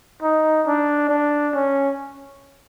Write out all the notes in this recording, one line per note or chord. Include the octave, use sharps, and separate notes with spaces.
D#4
D4
D4
C#4